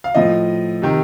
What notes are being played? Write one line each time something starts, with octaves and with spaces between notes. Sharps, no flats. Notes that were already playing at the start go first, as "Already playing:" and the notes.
F5
A2 F3 D#5
C3 D#3